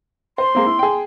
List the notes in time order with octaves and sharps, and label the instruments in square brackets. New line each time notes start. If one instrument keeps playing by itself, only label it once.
[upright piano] C5 [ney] C6
[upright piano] G#3 A#3 C4
E4
G#4 G5